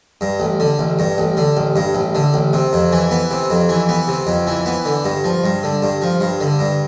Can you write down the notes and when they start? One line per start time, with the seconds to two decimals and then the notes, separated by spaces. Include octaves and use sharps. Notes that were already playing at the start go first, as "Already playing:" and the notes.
0.21 G2
0.40 A1
0.60 D3
0.79 A1
0.99 G2
1.18 A1
1.37 D3
1.57 A1
1.76 G2
1.95 A1
2.15 D3
2.34 A1
2.53 C3
2.73 F2
2.92 E3
3.11 B3
3.31 C3
3.50 F2
3.69 E3
3.89 B3
4.08 C3
4.27 F2
4.47 E3
4.66 B3
4.85 D3
5.05 G2
5.24 F3
5.44 G2
5.63 D3
5.82 G2
6.02 F3
6.20 G2
6.40 D3
6.59 G2